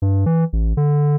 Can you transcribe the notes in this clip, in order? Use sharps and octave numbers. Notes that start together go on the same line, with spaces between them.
G2
E3
A1
D3